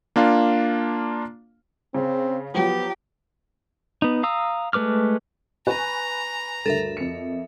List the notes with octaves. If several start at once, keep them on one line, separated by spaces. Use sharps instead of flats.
A#3 D4 F4 F5
C#3 C4
F3 F#3 B3 G4
B3 D#4
F5 A#5 D#6 E6
G#3 A3 B4 D6 F6
B4 G#5 A#5 C#6
D2 G2 A4 A#4 E5
F2 C#7